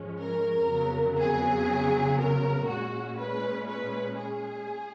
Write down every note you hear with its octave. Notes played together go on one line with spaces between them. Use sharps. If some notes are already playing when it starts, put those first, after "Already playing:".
Already playing: G#2 F3 G#3 C#4
A#4
F2 C#3 F#3 B3
G#4
A#4
A#2 G#3 C#4 F#4
B4
B4
G#4